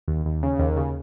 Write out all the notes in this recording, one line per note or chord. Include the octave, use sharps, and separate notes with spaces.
D#2
D#2
C#3
D#2
C#3